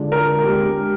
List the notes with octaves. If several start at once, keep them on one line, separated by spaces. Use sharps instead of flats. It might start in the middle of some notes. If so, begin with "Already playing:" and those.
Already playing: D3 G#3 D4 F4 G#4
A#4
G#3 D4 G4